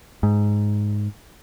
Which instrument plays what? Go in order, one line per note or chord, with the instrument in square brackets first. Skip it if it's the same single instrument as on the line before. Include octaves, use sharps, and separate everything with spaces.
[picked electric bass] G#2